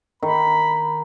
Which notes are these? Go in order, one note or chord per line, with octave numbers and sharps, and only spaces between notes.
D#3 B5